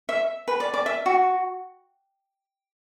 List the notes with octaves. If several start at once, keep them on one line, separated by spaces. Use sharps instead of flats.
E5
B4
D5
D5
E5
F#4